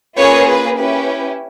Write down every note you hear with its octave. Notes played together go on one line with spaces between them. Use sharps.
A#3 C#4 F4 G#4 B4 C#5
B4
C#4 E4 G4 B4